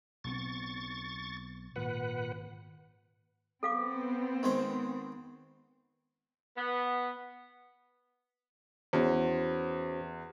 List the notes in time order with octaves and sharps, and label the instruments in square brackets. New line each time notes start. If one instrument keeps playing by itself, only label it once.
[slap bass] B1 B3 C4 [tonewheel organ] C#6 A6
[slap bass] G#1 [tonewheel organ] A#2 B4 F#5
[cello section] B3 C4 [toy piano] A4 F5 D6
[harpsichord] D#3 G#3 C5
[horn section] B3
[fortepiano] E2 [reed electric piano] C#4 F#4 C5